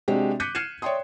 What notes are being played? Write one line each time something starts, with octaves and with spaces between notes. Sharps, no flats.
C3 G#3 D4 F#4 G4
D6 F#6 G6 B6 C#7 D#7
F6 G#6 C7 C#7 D#7 E7
C#5 D5 E5 G5 C6 D#6